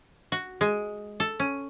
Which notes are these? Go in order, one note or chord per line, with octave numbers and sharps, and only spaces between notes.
F#4
G#3
A4
C#4